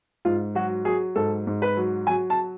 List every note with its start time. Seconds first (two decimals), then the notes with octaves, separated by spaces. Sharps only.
0.25 G#2 F4
0.55 F#3 F#4
0.85 F#3 G#4
1.16 G#2 A4
1.47 G#2
1.62 B4
1.77 F#3
2.07 F#3 G#5
2.30 A5